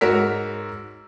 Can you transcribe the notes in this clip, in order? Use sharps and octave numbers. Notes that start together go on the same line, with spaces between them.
G#2 F#4 A#4 C#5 E6 B6